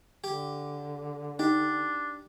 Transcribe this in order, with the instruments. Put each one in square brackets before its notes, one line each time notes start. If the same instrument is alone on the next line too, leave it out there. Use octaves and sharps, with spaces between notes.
[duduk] D3 [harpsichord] G4
[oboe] D4 [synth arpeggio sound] D#4 [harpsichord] G4